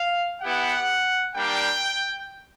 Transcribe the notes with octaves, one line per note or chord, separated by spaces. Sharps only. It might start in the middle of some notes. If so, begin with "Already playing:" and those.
Already playing: F5
B3 E4 G4 F#5
G3 A#3 D4 G5